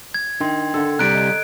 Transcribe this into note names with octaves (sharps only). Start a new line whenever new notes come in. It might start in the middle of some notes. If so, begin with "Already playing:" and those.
G#6
D#3 D4 G5 C6
D3 A4
C3 G3 A#5 F#6 D7
D#5